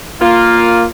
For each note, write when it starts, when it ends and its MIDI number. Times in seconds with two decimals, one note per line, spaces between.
0.21 0.86 58
0.21 0.86 65